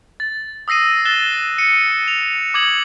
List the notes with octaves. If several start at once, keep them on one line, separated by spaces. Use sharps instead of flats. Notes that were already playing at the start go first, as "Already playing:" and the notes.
A6
D#6 E6 A#6 C7 D#7
E6 F#6 A6 E7 G7
C#7 D#7
F7
D6 D#6 G#6 F#7